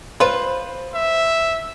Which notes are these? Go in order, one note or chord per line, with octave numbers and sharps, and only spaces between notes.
F4 B4 C5
E5